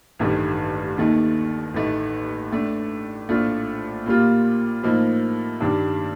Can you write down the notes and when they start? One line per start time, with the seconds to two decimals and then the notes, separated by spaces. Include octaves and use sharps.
0.19 A1 G2 D#3 A3
0.98 D#2 D#3 A3 D#4
1.74 A1 A2 A3 D#4
2.52 A2 A3 D4
3.29 A#1 A2 A3 D4 F4
4.06 A#2 G3 A#3 F4
4.83 A2 F3 A#3 D#4
5.61 G2 D#3 G3 D4